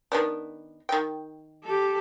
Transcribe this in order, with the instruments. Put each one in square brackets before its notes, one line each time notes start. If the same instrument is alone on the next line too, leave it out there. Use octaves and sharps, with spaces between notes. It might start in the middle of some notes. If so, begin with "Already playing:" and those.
[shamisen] D#3 B3 D4
D#3 G5
[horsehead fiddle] G4 A4